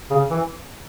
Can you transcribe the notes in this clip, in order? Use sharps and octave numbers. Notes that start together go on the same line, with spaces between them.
C#3
E3